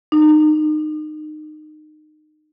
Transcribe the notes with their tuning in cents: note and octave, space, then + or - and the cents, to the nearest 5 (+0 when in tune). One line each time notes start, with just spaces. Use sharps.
D#4 -25